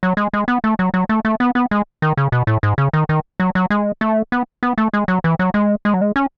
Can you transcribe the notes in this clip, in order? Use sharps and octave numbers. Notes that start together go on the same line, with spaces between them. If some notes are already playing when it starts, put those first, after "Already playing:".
F#3
G#3
G#3
B3
A3
F#3
F#3
A3
A3
B3
B3
G#3
D#3
C#3
B2
A2
G#2
C#3
D#3
D#3
F#3
F#3
G#3
A3
B3
B3
A3
G#3
F#3
E3
F#3
G#3
G#3
F#3
G#3
C#4